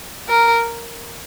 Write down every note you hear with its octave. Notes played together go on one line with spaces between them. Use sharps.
A#4